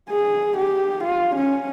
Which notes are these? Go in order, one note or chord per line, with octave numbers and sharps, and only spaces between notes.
G#4
G4
F4
C#4